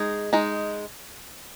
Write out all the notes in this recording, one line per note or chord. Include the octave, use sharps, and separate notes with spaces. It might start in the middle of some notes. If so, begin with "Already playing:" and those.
Already playing: G#3 D#4 G#4
G#3 D#4